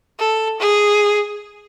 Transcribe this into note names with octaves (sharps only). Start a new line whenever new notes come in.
A4
G#4